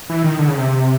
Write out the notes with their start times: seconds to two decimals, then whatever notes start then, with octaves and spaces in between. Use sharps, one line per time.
0.09 E3
0.24 D#3
0.39 D3
0.48 C#3
0.58 C3